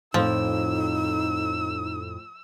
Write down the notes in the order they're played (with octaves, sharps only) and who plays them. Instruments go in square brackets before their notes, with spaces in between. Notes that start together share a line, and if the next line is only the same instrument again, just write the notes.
[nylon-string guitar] F2 A2 [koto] F3 [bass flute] D#4 [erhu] E6